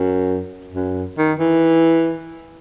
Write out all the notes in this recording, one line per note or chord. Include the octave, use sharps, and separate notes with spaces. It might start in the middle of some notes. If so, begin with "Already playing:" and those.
Already playing: F#2
F#2
D#3
E3